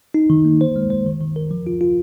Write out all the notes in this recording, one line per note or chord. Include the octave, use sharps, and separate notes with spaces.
D#4
D#3
A#3
C5
G#3
C5
D#3
D#3
A#4
F3
F4
F4